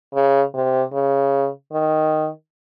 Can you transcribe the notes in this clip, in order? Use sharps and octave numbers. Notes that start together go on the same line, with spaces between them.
C#3
C3
C#3
D#3